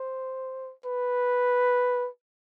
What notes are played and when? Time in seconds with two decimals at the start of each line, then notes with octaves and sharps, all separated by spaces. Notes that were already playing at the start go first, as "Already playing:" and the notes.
Already playing: C5
0.86 B4